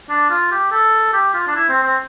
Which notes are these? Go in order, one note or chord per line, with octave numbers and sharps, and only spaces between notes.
D4
F4
G4
A4
G4
F4
D4
E4
C4
C4